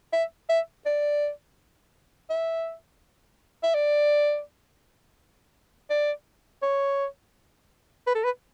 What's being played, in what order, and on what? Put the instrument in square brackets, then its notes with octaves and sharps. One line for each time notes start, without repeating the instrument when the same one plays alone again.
[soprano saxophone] E5
E5
D5
E5
E5
D5
D5
C#5
B4
A4
B4